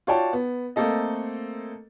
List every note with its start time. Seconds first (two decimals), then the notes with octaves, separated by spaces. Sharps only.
0.07 F4 F#4 C#5 D5 G5 A5
0.33 B3
0.76 A3 A#3 C4 A4 D#5